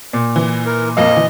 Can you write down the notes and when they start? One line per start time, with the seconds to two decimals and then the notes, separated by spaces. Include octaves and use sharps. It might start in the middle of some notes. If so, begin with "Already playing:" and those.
0.13 A#2
0.36 E3
0.66 A#4
0.97 F2 A#3 D#5 F5
1.17 E3